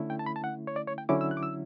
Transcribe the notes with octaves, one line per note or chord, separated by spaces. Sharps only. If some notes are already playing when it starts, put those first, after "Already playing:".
Already playing: D3 A3 C#4 E4
G5
A5
B5
A5
F#5
C#5
D5
C#5
G5
D3 F#3 C#4 E4 D6
E6
F#6
D6
E6